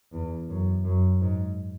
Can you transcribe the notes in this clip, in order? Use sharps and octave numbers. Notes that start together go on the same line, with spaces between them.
E2
F#2
F#2
G#2